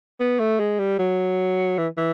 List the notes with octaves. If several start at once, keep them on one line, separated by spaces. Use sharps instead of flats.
B3
A3
G#3
G3
F#3
E3
E3